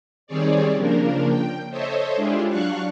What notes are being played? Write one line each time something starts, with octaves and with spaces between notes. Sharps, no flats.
D#3 G3 C4 G#4 C#5 D5
C#3 F3 A#3 D4 A#4
G5
A4 C5 C#5 D#5 E5
G#3 D4 E4 F4 G4 G#4
F#3 D4 F5 C#6 F#6